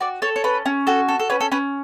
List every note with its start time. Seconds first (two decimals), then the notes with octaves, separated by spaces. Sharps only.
0.01 F#4 D5
0.22 A4 C#5
0.36 C#5
0.44 C#4 B4
0.66 C#4
0.87 F#4 A4
1.08 A4
1.20 A4
1.30 C#4 B4
1.40 A4
1.52 C#4 B4